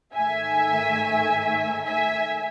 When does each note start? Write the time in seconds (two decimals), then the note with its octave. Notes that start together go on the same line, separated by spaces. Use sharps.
0.15 G#2 D#3 A3 E5 G#5
1.85 E5 G#5